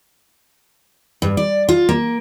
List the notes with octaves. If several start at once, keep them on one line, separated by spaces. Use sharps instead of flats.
G2
D5
F4
A#3